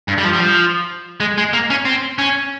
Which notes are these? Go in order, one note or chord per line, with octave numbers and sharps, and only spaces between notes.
G2
G3
F3
G3
F3
G#3
G#3
A#3
C#4
C4
C#4